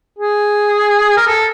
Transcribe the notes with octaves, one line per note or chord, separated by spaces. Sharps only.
G#4
A#4
A4